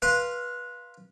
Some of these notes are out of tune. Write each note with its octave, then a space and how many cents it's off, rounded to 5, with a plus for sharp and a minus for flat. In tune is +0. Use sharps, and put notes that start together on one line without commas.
B4 -20 F5 +0 C6 +0